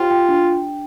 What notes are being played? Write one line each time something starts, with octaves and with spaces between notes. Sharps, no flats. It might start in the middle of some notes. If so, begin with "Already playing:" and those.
Already playing: F4 G4 C5 G5
G5
D4